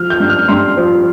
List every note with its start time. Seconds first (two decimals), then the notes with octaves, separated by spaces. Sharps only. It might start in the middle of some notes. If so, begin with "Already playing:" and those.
Already playing: F3 F6
0.10 G6
0.20 G2
0.30 F6
0.48 G2 C6
0.77 F3